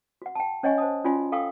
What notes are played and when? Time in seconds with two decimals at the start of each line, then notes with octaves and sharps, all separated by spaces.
0.22 F#4 F#5
0.35 G5 A5
0.63 C#4 C#5 D#5 F#5 G#5 C#6
0.78 C5 A5 D#6
1.04 C#4 F4 F#4 D5 G#5 C6
1.32 A4 F5 G5 C#6 D#6 E6